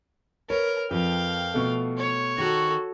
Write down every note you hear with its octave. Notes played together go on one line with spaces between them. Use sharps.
A#4 B4 C#5
F2 F3 B4 F5 G5
B2 A3
C#5
D#3 F#4 A4